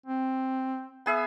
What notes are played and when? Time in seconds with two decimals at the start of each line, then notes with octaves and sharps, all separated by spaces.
0.06 C4
1.06 B3 G#4 E5